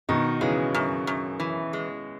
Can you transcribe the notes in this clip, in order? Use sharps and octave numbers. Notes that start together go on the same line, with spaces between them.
B2 D#3 D#4
C#3 E3 G#3
F#2
F#2
E3
G#3